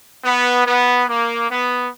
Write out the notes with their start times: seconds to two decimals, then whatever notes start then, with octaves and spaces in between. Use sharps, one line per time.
0.24 B3
0.66 B3
1.09 A#3
1.50 B3